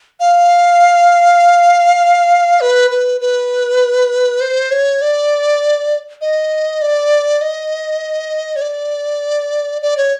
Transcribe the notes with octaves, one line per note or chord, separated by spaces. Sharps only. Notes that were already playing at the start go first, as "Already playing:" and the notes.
F5
B4
B4
B4
C5
C#5
D5
D#5
D5
D#5
C#5
D5
D5
C#5